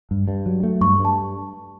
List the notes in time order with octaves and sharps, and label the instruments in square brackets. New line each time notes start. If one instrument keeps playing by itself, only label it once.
[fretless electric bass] G2
G2
F#3
A3
[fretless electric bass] G2 [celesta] C#6
[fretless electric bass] G2
[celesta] A5